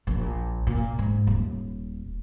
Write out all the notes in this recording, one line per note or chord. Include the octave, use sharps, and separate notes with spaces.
A#1
A#2
G#2
D#1